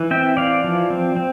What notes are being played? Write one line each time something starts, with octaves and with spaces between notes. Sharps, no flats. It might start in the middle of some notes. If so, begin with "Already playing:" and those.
Already playing: E3
C4 E5 G5
E3 D5 F5
F3
C4
C4